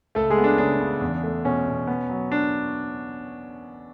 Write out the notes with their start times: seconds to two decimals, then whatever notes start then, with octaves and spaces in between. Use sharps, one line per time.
0.15 C#2 A3 A4
0.30 G#3 G#4
0.37 B3
0.44 D4
0.58 C#3 D4
0.80 C#3
1.01 E2
1.23 A3
1.44 B2 C#4
1.67 B2
1.87 B3
2.10 F#3
2.32 D4